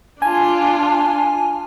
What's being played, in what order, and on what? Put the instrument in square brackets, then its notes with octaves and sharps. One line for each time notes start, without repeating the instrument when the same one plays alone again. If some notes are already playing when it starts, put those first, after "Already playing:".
[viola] D4 F4 [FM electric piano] G#5 [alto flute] A5